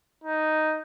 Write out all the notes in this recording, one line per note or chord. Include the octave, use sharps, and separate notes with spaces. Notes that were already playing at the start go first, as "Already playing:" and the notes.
D#4